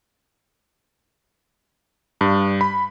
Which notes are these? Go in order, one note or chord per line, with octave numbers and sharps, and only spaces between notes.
G2
B5